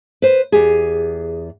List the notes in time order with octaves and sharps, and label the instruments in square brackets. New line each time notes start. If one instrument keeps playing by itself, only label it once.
[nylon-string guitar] B4 C5
E2 G4 G#4